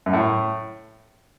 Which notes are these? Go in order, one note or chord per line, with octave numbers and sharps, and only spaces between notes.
F#2
A2